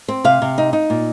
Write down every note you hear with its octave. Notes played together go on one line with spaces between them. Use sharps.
C4
C3 F5
C3
D#4
D#4
A#2